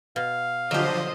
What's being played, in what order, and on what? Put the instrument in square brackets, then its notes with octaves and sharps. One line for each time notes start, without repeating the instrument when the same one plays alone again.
[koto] B2 [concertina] F5
[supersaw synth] D3 F3 [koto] F#3 G4 [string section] F4 C5 D#5